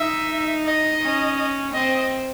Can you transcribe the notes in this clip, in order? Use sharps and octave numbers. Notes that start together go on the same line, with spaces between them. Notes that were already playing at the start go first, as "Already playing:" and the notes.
Already playing: D#4 E5
D#5
C#4
C4 D#5